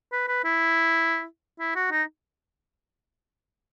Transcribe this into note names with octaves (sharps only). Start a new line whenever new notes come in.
B4
B4
E4
E4
F#4
D#4